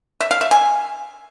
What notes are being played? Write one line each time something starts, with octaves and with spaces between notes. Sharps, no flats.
E5
F5
E5
G#5